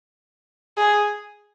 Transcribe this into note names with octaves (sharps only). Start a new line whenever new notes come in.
G#4